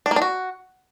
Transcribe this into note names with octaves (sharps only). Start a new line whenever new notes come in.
D4
A#3
D4
F#4